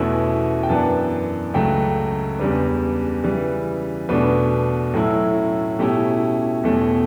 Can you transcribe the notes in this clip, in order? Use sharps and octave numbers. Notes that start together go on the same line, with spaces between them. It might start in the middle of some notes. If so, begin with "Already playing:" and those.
Already playing: E2 B2 A3 C#4 E4 B4
G5
F#2 E3 B3 D4 A5
C#2 C#3 F#3 A3 G5
E2 C#3 G3 D4 B4
C#3 E3 G3
E2 B2 A3 D4 B4
A2 F#3 C#4 E4 A4
B2 A3 C#4 E4 G4
E2 B2 A3 C#4